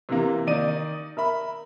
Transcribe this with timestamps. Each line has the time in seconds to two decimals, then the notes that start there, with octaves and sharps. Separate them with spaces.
0.09 C3 E3 A#3
0.47 D#3 D#4 D5 D#7
1.17 A#4 E5 B5